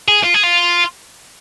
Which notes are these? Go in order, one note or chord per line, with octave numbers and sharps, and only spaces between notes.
G#4
F4
G#4
F4